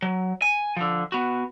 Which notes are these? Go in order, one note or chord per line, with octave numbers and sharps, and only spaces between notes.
F#3
G#5
D3 F3
B3 F#4